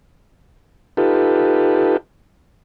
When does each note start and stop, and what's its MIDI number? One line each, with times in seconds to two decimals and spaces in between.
0.97 1.97 63
0.97 1.97 65
0.97 1.97 67
0.97 1.97 69
0.97 1.97 71